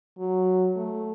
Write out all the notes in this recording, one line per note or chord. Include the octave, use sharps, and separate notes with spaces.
F#3
A3